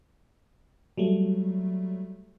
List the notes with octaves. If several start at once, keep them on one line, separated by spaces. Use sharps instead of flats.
F#3 G3 A3